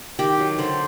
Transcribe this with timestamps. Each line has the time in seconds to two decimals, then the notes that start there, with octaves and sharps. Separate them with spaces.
0.19 D#3 G4
0.39 F#3
0.59 D3 C5